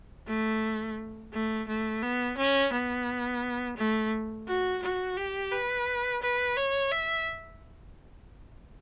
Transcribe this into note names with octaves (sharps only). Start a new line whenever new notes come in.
A3
A3
A3
B3
C#4
B3
A3
F#4
F#4
G4
B4
B4
C#5
E5